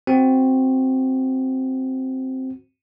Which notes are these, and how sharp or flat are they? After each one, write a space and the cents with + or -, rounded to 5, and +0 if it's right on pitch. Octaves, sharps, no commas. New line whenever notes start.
C4 +0 F#4 +0